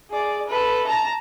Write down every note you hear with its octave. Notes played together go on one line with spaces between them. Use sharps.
G#4 D5
A4 B4
A5 A#5